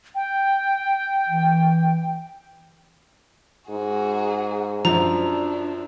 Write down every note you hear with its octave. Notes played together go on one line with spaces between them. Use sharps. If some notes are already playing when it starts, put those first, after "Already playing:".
G5
E3
G#2 F#4 G#4
F#2 F3 D4 A#5